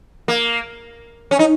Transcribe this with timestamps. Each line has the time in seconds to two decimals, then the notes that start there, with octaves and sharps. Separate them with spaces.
0.28 A#3
1.31 C#4
1.39 D#4